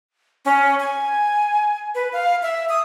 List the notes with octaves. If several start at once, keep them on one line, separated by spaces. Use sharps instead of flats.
C#4
G#5
B4
F5
E5
D#6